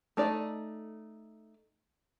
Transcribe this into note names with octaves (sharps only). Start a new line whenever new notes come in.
A3 D#4 D5